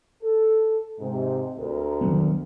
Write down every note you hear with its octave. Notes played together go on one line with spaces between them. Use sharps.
A4
G#2 C3
D2 A#4
D#3 F#3 B3